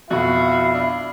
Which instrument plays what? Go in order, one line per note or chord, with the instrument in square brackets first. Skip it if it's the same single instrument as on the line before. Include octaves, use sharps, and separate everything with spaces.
[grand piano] F2 B2 [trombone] E4 [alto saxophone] F#4 [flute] F5
[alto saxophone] D4